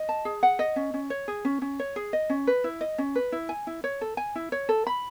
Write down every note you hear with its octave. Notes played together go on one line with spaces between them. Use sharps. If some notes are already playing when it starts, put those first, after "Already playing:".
Already playing: D#5
A5
G#4
F#5
D#5
C#4
C#4
C#5
G#4
C#4
C#4
C#5
G#4
D#5
C#4
B4
E4
D#5
C#4
B4
E4
G#5
E4
C#5
A4
G#5
E4
C#5
A4
B5